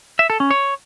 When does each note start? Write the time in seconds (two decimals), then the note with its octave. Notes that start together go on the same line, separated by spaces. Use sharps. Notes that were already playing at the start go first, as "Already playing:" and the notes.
0.19 E5
0.30 A4
0.40 C#4
0.51 C#5